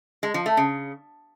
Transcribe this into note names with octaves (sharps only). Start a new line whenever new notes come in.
G#3
F3
A3
C#3